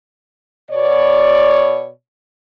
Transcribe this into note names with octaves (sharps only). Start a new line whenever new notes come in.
B2 C#5 D5